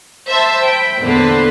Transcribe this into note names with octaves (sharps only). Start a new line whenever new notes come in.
C5 E5 A5 B5
G5 B5
E2 A#2 D3 B4 C5